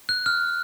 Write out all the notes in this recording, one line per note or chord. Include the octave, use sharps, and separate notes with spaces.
F#6
F6